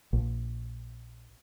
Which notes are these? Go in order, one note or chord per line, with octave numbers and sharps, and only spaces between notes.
A#1